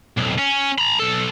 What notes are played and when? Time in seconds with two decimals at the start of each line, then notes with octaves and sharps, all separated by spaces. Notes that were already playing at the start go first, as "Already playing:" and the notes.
0.17 B1 F2
0.38 C#4
0.78 A#5 B5
0.99 B1 A4